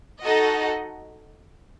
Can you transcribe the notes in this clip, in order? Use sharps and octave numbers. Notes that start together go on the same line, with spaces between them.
D#4 F#4 A4 D#5 F#5